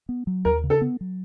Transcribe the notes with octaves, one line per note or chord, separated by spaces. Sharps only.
B3
F#3
D#2 A#4
C#3
A4
B3
F#3